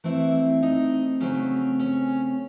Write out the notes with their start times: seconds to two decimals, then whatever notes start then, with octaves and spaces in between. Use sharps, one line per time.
0.04 E3 A3 C4 E4
0.63 D#4
1.20 C#3 F#3 A3 C4 C#4
1.79 C#4